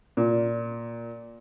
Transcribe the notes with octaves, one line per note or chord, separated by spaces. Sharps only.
A#2